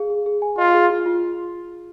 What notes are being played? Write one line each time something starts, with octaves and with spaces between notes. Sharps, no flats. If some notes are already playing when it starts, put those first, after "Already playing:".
Already playing: G#4 F5
G#4
G#4
G#5
F4 D#5
G#4
F4
F4